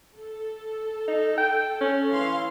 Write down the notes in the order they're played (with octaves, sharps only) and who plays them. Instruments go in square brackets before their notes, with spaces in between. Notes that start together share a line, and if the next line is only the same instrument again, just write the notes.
[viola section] A4
[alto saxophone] D#4
G5
C#4
[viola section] E3 F5 C6